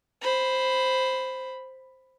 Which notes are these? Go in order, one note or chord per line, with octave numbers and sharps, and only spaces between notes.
C5 B5